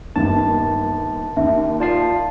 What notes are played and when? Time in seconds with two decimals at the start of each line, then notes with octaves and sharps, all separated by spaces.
0.16 G1 D#2 A5
1.37 D#2 E5
1.80 F4 D5 F5 A5 C7